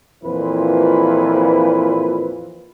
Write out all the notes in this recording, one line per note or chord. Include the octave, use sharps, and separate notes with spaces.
F2 A#2 E3 E4 B4 C5